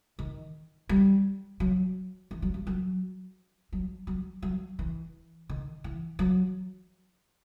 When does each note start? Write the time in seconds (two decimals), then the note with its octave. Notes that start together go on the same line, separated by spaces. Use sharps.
0.19 D#3
0.89 G3
1.60 F#3
2.31 E3
2.42 F#3
2.54 G3
2.67 F#3
3.73 F#3
4.07 F#3
4.42 F#3
4.79 E3
5.49 D#3
5.84 E3
6.19 F#3